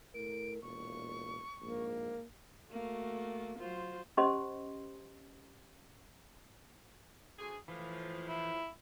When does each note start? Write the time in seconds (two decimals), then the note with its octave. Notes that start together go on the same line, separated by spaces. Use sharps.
0.14 A2 A#4 D7
0.62 E1 A#2 C#6
1.62 A#1 G#2 A#3
2.70 A3 A#3 F#4
3.59 F#3 F4 C5
4.17 C#4 G4 C5 D#5 C6
7.38 D2 G#4
7.68 A2 E3 F3
8.28 E4